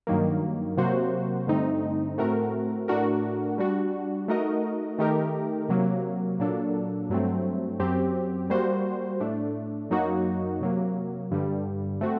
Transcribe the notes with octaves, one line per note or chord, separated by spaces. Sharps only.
G2 D#3 F#3 A#3
C3 F#3 A#3 F#4 C5
G2 D3 A3 C4 D#4
A2 A3 C4 F#4 A#4
A2 A3 D4 F#4 A#4
G3 D4 F#4
A3 D#4 F#4 A#4 D#5
D#3 A3 D#4 G4 A#4
C3 F#3 A#3
A#2 F#3 A#3 D4 A4
G2 F#3 A3 C4
F#2 F#3 C4 G4
G3 A#3 F#4 C5
A2 A3 D4
F#2 F#3 A#3 D#4 F#4
C3 F#3 A#3
G2 D3 G3
A3 C4 F#4